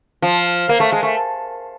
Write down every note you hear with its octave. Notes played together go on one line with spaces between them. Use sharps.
F3
A#3
A3
G#3
A3